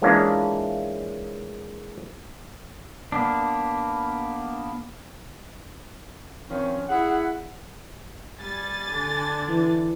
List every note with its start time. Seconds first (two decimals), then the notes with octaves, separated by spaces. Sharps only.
0.02 E3 G#3 A#3 C#4 D4 F4
3.12 A#3 B3 D4
6.50 D#3 F3 C4 C#4
6.89 E4 G#4 F#5
8.39 G3 G#5 A6
8.91 D3 D4
9.49 E3